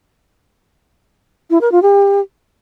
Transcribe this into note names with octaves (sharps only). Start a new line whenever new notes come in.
E4
A#4
F4
G4